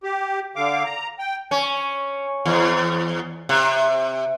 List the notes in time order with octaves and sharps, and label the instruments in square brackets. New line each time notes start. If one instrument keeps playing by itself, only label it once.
[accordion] G4
D3 F5 D6
A#5
G5
[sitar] C#4
E2
C3